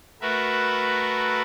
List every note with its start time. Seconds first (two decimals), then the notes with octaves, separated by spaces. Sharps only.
0.21 A3 F#4 A#4 B4 E5